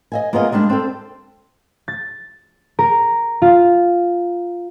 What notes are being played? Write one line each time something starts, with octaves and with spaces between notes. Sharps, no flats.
D#5 E5 G#5
A#3 B3 F4 G#4 A#4 D#5
G3 G#3 A#3 D4
C4 A4
A6
A#4
F4